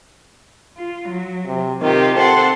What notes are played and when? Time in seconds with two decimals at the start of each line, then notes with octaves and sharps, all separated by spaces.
0.77 F4
1.10 F#3
1.46 C3
1.82 C3 D#3 F4 G4
2.16 C4 A4 F#5 C6